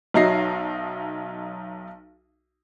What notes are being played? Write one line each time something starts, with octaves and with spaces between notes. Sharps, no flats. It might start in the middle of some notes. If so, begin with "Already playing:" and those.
B1 F#3 D#4 E5 A#6 C7